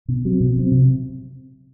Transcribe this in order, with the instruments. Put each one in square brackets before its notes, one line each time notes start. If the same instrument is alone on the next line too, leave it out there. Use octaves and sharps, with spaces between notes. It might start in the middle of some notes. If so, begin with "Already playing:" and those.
[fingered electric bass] B2
F#3 C4
B2
F#3 C4
C3